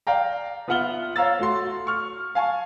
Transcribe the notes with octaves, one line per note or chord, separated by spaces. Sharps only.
D5 F5 G5 A#5
B3 F4 E5 F#5 F6 G7
C#5 F5 A#5 E6 A6
A3 F#4 C6
C#6 F6
F5 G#5 A5 C#6